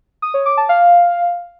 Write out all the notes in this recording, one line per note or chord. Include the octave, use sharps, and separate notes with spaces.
D#6
C#5
D6
A5
F5